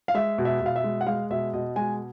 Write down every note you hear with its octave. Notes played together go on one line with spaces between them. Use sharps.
F5
G#3 E5
B2
E5
B2
F5
E5
G#3
F#5
G#3 F5
B2 E5
B2 D#5
G#3 G#5